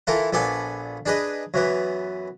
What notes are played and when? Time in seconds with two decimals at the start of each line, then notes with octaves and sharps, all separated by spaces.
0.07 E3 E4 F4 A4 A#4
0.33 A#1 B3 A4 D5 G#5
1.06 D4 G#4 B4 D#5
1.54 F#2 E3 B3